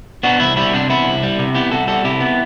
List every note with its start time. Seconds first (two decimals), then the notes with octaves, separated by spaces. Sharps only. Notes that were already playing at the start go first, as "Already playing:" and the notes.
0.23 B3 D4 F#4
0.40 C2 E4
0.57 G3 E4
0.73 C3 D4
0.90 B3 E4
1.06 C2
1.23 G3
1.39 C3
1.55 B3 E4 G4
1.71 C2 F#4 A4
1.87 G3 F#4 A4
2.04 C3 E4 G4
2.20 B3